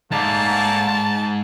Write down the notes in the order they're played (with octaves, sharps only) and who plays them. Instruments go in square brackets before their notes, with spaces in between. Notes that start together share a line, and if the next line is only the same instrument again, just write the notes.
[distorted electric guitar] G#2 [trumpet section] A3 A#3 D5 [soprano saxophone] A5